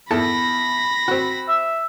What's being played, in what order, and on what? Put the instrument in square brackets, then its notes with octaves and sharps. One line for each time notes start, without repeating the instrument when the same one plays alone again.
[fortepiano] E2 A4 A5 [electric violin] B5 A#6
[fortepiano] C4 F#4
[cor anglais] E5